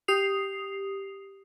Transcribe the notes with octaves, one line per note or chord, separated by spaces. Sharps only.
G4 D#6 C7 F7